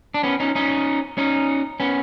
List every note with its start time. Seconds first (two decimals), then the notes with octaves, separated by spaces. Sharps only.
0.14 D4
0.23 B3 C#4
0.40 C#4 D#4
0.55 C#4 D#4
1.18 C#4 D#4
1.80 B3 C#4